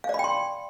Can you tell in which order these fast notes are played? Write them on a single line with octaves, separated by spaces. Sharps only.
F5 D5 B5 G5 C6